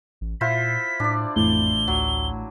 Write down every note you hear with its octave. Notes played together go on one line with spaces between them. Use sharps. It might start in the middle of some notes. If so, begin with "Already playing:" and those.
A1
A#2 E4 F4 C5 B6
A2 D4 D5
A1 F2 A2 G7
D2 F#3